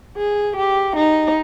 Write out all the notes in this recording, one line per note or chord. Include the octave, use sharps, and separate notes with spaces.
G#4
G4
D#4